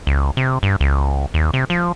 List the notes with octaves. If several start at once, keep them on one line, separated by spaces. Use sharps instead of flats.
C#2
C3
G2
C#2
D#2
C3
F3